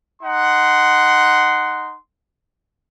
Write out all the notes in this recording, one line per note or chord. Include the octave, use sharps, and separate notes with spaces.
D#4 F#5 C6